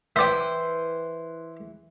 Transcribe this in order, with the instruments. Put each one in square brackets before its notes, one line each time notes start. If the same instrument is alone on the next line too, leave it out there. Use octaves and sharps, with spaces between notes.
[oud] E3 [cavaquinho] C5 G5 [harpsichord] D5 E5